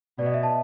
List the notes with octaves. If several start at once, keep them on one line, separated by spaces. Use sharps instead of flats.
B2 D5
D#5
E5
A5